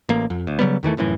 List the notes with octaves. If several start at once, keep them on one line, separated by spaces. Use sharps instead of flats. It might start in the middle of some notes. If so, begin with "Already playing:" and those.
A1 A#3
F2
D2
C#3 F#3 G3 B3
E2 D#3 E3 A3
F1 F#2 A2 E3